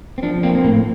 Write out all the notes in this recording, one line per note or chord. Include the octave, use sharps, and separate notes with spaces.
C4
F3 D4
A#3 C4
C4
A2 A#3